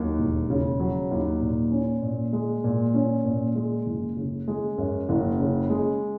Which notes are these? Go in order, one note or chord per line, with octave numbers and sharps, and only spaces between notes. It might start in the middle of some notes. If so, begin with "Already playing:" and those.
Already playing: D#2 F#3
E1
C#3
F#3
D#2
A#2
C#4
A#2
G#3
A#2
C#4
A#2
G#3
F#1
C#3
G#3
F#2
F#1
C#3
G#3